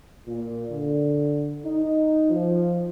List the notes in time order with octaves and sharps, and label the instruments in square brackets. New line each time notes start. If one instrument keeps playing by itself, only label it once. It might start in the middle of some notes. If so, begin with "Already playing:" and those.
[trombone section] A#2
D3
D#4
F3